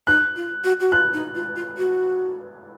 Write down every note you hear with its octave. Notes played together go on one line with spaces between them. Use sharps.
D#4 F#6
F4
F#4
F#4
F4 F#6
D#4
F4
F4
F#4